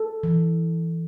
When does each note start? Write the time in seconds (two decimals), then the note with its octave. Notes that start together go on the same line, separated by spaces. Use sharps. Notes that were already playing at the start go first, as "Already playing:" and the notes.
Already playing: A4
0.23 E3